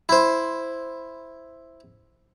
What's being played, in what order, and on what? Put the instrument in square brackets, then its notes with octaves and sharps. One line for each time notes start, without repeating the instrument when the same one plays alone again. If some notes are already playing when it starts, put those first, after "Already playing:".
[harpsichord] E4 C5